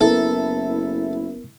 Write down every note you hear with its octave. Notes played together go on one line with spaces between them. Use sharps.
F#1 B3 E4 A4 A#4